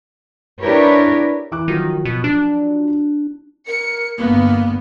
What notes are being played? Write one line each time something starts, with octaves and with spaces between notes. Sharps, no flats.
D4 E4 G4 A#4 B4 C#5
E3 D6 F#6
D#3 F3 F#3
B2
D4
A#4 C#7
G1 G2 A#3 B3